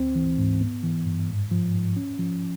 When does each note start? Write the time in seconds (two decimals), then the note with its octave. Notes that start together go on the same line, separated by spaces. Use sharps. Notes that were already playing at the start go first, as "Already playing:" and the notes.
Already playing: D2 C4
0.15 E3
0.38 G#2
0.61 B3
0.83 E3
1.06 G2
1.29 G#2
1.51 F3
1.74 G#2
1.96 C#4
2.19 F3